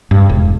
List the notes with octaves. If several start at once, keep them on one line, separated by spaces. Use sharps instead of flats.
G2
E1